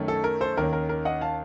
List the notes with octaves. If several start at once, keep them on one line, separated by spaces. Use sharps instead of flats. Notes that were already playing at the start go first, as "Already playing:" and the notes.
Already playing: F#2 D#3 A3 C#4
A4
A#4
A4 C5
D#2 D#3 A#3 C#4 A#4
A#4
A#4
D#5 F#5
F5 A5